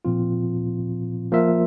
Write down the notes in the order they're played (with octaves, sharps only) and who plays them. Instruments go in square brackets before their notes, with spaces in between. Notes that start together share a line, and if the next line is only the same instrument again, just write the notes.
[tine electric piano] A#2 F3 C4 F4
F3 A#3 F4 A#4 E5